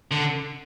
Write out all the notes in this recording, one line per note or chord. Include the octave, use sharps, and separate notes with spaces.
D3